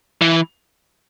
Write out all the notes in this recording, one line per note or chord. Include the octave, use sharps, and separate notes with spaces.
E3